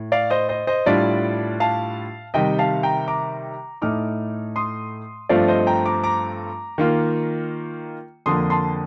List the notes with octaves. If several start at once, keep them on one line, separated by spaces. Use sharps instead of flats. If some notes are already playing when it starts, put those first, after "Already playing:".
Already playing: A2
D5 F5
C5 D#5
C5 D#5
C5 D#5
A2 G3 D4 F4 D5
F5 A5
C3 D#3 G3 D#5 G5
F5 A5
G5 A#5
A#5 D6
A2 A3 D#4 D6 F6
C6 D#6
G2 F3 A3 C4 F4 D5 F5
C5 D#5
G5 A#5
A#5 D6
A#5 D6
D#3 A#3 F4
F2 D3 F3 A#3 C6 D#6
A5 C6